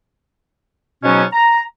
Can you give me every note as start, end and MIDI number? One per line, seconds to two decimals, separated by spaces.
1.03 1.23 44
1.03 1.23 47
1.03 1.23 54
1.03 1.23 59
1.03 1.23 61
1.32 1.62 82